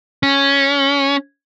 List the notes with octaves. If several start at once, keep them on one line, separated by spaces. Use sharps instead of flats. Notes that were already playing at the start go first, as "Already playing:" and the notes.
C#4